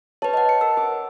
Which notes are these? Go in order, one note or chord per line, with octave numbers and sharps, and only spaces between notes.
B4 C#5 A5
D#5 F#5
C#7
A#4 E6
D6